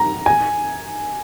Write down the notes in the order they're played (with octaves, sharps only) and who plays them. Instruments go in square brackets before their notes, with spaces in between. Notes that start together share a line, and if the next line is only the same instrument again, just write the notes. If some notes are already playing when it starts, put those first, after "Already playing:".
Already playing: [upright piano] A#5
G#5